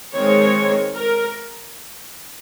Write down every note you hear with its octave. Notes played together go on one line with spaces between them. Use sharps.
D#3 G#3 C4 C#5
A#4